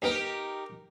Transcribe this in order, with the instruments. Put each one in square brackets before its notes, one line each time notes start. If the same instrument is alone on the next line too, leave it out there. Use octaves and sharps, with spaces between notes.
[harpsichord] D#2 B3 [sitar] D#4 G4 A#4